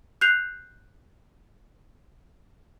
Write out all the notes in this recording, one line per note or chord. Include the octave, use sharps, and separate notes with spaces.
F#6 G6 C7 F7